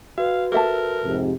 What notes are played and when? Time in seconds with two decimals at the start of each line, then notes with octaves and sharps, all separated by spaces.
0.18 F#4 B4 F5
0.52 A4 A#4 E5 A5
1.05 F2 G#2 C3